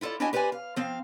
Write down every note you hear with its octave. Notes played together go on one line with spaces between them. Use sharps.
E4 F4 A4 A#4 D5
D4 E4 F#4 G4 D#5 G#5
G4 B4 C5 D5 G#5
F5
F3 C4 F5